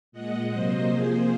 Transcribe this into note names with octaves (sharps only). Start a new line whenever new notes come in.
A#2 G#3 D#5 F#5
C3 F#3 A#3 C5 D#5
C3 F3 A#3 G#4 C5